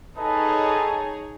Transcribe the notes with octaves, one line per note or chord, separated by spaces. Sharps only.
D#4 G#4 A4 B4 C#5 D#5 A5